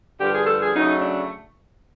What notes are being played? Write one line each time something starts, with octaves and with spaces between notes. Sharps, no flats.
G2 D3 F3 G4
G#4
A4
G#4
C#3 F#3 A3 D#4
D4